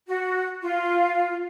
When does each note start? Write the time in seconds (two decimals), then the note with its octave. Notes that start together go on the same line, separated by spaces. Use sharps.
0.07 F#4
0.62 F4